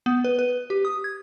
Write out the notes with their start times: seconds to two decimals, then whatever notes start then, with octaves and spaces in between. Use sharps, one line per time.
0.06 B3
0.24 B4
0.39 B4
0.70 G4
0.85 D#6
1.04 G#6